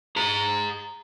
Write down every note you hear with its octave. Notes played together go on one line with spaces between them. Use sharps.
G#4 A#5